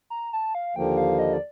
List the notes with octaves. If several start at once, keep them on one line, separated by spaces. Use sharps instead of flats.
A#5
A5
F5
D#2 D3 F3 A#3 G5
F5
D#5
D5